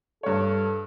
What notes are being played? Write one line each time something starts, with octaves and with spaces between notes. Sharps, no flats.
G2 A4 C#5